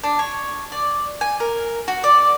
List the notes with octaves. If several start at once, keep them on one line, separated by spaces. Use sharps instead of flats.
D4
C#5
D5
G#5
A#4
F#4
D5